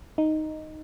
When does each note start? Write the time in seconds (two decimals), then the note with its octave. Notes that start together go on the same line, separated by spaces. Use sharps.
0.18 D#4